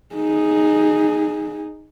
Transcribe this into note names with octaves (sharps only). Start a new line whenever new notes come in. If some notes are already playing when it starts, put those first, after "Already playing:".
D#4 G#4